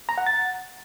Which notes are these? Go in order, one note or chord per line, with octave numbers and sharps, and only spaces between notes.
A#5
F#5
A6